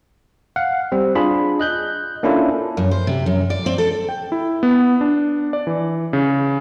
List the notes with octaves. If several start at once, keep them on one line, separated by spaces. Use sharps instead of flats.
F5 F#5
G3 C4
D4 F4 G#4 B5
D#5 F#6 G6
A#3 C#4 D4 E4 F4 A4
F#2
C5
C3
F#2
D5
C4
A4
G5
E4
B3
D4
D5
E3
C#3